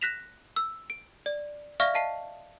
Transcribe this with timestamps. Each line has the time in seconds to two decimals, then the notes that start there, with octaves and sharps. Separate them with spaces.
0.01 F#6 A#6 B6 E7 F7
0.56 E6
0.90 D7
1.26 D5
1.80 D5 E5 F5 C#6 F6 A#6
1.94 D#5 F5 A5 C7